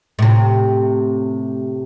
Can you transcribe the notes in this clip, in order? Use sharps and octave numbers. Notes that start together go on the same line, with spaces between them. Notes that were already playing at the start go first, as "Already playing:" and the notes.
A2 C3